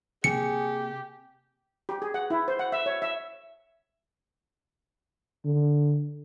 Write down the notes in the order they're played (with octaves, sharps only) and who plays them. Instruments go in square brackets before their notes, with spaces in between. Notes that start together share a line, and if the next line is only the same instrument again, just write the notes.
[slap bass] C3 A#3 [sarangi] G4 [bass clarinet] G#4 [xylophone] C#7
[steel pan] G4
G#4
F#5
E4
C5
F#5
E5
C#5
E5
[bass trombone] D3